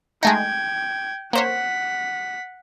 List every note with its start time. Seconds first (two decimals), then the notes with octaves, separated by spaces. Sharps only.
0.23 G#3 A3 D#4 G5 G#6
1.33 A#3 C5 C#5 F#5 B6